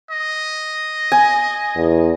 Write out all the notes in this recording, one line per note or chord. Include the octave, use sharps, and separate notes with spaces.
D#5
G#5 D#6
E2